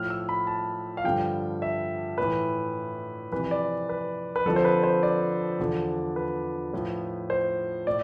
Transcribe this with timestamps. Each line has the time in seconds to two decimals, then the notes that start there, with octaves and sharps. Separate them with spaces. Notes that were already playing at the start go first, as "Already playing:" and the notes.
Already playing: A2 F3 F6
0.10 E6
0.29 B5
0.47 A5
0.97 F5
1.04 G2 D3 F3 G5
1.62 E5
2.18 A2 E3 B4
3.32 F2 C3 E3 B4
3.51 D5
3.89 B4
4.36 B4
4.45 F2 D3 F3 A4
4.56 C5
4.65 B4
4.83 C5
5.03 D5
5.59 E2 D3 F3
6.16 B4
6.73 A2 F3
7.30 C5
7.87 A2 D5